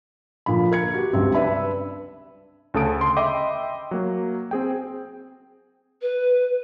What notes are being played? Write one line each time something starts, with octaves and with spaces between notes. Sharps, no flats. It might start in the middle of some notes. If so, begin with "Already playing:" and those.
A#2 D3 F3 B5
A#4 G#6 C#7
F#4 G4
C#2 G2 C3 C4
D4 B4 E5 B5
D2 C#3 A4 A5 D#6 D7
C6
D#5 E5 G5 B5 C6 D6
F#3 A#3
C4 G#4 G5
B4